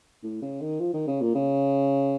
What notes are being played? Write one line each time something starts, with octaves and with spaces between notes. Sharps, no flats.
A2
C#3
D#3
F3
D#3
C#3
A#2
C#3